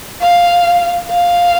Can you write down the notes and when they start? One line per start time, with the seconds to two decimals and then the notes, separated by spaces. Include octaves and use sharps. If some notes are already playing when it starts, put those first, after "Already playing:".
0.21 F5
1.11 F5